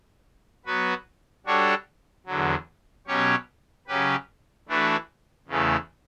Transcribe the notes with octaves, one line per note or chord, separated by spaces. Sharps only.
F#3 B3 F#4 B4
G3 D4 F#4 A4 C#5
E2 D3 F#3
B2 F#3 C#4 G4 C#5
C#3 F#3 C#4 G4 B4
E3 A3 D4 F#4 B4
E2 C#3 E3 A3